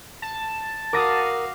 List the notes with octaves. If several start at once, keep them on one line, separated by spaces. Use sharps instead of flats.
A5
F#4 A#4 F5 D6 D#6 A#6 D#7